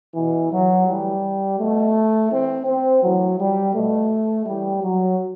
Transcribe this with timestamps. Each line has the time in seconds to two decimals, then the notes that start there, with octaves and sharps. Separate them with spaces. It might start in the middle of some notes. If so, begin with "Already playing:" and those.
0.15 B2 E3
0.52 F#3
0.87 A2 E3 G3
1.58 B2 A3
2.31 A2 E3 C4
2.66 C4
3.03 A2 E3 F#3
3.39 G3
3.74 B2 A3
4.46 A2 E3 G3
4.83 F#3